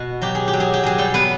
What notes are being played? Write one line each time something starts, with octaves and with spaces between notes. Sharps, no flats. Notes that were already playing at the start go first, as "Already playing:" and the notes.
Already playing: B2 F#4
F#3 G4
G#4
G4
F#3
G#4
G4
F#3 G#4
G3 G4
B3 B4